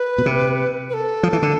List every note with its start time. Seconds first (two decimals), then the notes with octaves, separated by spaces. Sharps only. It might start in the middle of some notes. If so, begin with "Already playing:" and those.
Already playing: B4
0.18 B2
0.26 C3
0.89 B4
0.94 A4
1.23 F3
1.33 E3
1.42 D3